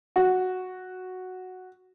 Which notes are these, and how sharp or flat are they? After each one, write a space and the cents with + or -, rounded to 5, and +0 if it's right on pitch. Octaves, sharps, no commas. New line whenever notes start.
F#4 -5